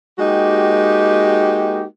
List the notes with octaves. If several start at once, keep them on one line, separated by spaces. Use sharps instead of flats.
G#3 A#3 D#4 F#4 G4